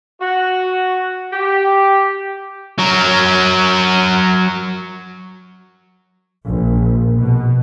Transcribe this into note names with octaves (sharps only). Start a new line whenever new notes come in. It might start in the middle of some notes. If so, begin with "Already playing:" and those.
F#4
G4
F#3 A#4
A#1
B2